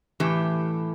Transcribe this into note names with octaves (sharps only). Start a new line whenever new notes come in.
A2 E3 G4